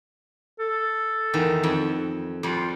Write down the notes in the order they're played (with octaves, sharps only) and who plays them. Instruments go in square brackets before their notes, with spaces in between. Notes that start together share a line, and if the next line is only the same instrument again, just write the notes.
[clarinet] A4
[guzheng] E2 D#3
F2
[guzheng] F2 G3 [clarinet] F4